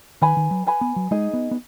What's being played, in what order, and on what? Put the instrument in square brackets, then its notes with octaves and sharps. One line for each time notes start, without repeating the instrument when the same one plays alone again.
[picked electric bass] D#3 [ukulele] B4 G#5 B5
[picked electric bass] D#3
F#3
[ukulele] B4 G#5 B5
[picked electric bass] B3
F#3
[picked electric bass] G#3 [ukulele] D#4 G#4 D#5
[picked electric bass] B3
B3